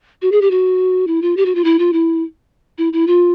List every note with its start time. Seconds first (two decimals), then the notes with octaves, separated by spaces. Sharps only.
0.22 F#4
0.32 G#4
0.41 G4
0.51 F#4
1.07 E4
1.22 F4
1.37 G4
1.46 F#4
1.55 F4
1.64 E4
1.79 F4
1.93 E4
2.78 E4
2.93 E4
3.07 F4